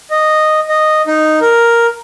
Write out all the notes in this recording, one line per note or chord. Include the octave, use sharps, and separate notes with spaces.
D#5
D#5
D#4
A#4